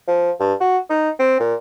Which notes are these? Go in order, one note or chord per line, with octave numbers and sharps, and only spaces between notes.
F3
G2
F#4
D#4
C4
A#2